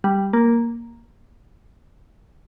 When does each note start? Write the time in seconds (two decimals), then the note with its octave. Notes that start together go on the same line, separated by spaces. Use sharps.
0.04 G3
0.33 A#3